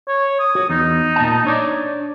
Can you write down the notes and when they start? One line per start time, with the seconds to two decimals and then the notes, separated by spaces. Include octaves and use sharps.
0.08 C#5
0.39 D#6
0.55 F#4
0.69 E2 D#4
1.16 A#2 D#5 A5
1.45 D4 C#5 D5